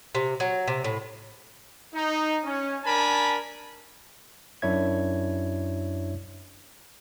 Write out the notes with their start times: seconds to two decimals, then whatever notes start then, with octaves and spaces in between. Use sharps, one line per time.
0.15 C3
0.40 F#3
0.68 C3
0.84 A2
1.94 D#4
2.45 C#4
2.84 D4 A#4 G#5 A5 B5
4.62 F#2 D4 E4 C#5 E5 G#6